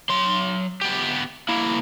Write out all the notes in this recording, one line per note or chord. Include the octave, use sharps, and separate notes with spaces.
F#3 C6
B3 G4
A#3 E4